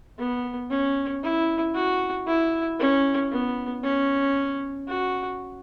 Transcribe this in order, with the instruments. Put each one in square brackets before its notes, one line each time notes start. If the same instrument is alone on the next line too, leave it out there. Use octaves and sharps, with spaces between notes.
[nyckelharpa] B3
C#4
E4
F#4
E4
C#4
B3
C#4
F#4